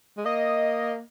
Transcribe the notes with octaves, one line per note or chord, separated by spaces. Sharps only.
G#3
A#3 D#5